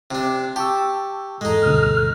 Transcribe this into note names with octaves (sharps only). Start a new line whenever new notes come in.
C3 D4
G4 A5 C#6 E6
E2 G#2 G#3 D#4 A4
D2 G2 B2 F6